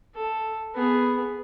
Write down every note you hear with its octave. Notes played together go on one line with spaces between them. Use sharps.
A4
B3 G#4